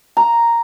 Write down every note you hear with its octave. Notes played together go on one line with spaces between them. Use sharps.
A#5